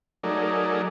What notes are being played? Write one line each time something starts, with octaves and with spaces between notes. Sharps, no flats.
F#3 A3 D#4 G#4 A#4 D5